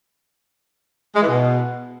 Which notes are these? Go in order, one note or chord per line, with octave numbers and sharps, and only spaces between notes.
G#3
E3
B2